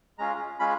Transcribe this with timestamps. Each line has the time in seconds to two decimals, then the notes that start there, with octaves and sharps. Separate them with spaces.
0.18 G#3 C#4 F4 A#5
0.59 G#3 C#4 F4 B5